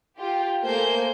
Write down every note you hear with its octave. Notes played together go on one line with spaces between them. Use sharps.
F4 G4
A3 A#3 C5 G#5 G6